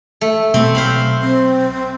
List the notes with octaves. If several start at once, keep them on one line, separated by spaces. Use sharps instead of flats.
A3
B2 A3 C4
B1 C5 F5 B5
C4